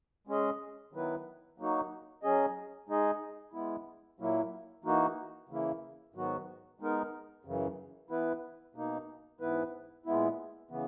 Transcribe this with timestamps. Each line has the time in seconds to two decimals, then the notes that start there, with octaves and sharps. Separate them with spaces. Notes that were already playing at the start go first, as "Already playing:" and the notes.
0.27 G#3 C#4 G#4 D#5
0.93 D#3 F#3 B3 E4 B4
1.58 F#3 A#3 D#4 F#4
2.23 F#3 C#4 G#4 D#5
2.89 G#3 D#4 G#4 D#5
3.54 G#3 B3 E4
4.19 A#2 F#3 A#3 E4
4.84 E3 A#3 D#4 F#4
5.49 C#3 E3 A#3 E4
6.14 G#2 D#3 F#3 B3 F#4
6.80 G#3 B3 D#4 A#4
7.45 F#2 C#3 E3
8.10 E3 B3 E4 B4
8.75 B2 A#3 D#4
9.40 G#2 E3 B3 E4 B4
10.06 A#2 G#3 B3 E4
10.70 C#3 E3 B3